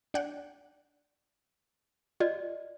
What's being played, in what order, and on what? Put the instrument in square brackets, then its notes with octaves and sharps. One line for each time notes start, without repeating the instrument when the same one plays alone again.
[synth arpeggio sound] D4 F#5 G5
[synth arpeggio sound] F4 [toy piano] D5 D#5